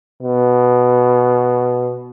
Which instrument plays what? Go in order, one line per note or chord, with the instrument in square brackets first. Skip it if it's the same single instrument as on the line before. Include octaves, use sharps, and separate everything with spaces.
[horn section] B2